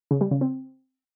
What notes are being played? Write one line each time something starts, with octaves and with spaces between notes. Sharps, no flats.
C#3
G3
C#3
C4